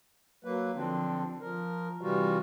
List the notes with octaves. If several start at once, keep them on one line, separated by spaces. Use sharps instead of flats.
F#3 A#3 B4
D3 F3 C4 D4
F3 A#4
C3 E3 G3 F4 F#4